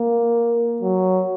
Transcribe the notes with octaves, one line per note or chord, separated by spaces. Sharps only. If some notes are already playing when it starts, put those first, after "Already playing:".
Already playing: A#3
F#3